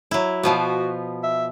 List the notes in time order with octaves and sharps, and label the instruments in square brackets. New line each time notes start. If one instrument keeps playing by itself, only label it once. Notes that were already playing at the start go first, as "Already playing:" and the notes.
[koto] F#3 E4
[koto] B2 F3 B3 [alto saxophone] F#4
[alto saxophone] E5